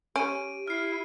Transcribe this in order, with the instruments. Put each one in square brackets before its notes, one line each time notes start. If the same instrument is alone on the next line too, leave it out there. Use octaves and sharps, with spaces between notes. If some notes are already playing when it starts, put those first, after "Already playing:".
[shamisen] C#4 [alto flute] G4 [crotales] D7 D#7
[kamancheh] E4 [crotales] F6 C7